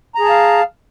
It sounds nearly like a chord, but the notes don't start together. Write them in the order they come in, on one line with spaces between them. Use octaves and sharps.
A#5 G#4 A5 F5